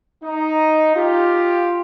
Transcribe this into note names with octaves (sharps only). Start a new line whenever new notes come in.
D#4
F4 G4